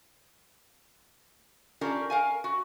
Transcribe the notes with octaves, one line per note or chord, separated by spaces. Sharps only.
C#4 D4 F4 G4 A#4
A#4 F5 G#5
F#4